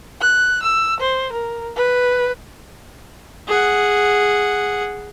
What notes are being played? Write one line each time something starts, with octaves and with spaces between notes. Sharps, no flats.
F#6
E6
C5
A#4
B4
G#4 F#5